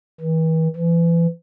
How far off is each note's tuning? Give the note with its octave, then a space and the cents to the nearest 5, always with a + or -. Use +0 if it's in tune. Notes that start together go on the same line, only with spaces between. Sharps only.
E3 -40
E3 +30